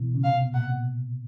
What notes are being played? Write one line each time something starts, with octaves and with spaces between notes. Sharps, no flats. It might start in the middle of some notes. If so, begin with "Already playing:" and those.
Already playing: B2 E3
C#3
F5
C3
B2
A#2 F#5
B2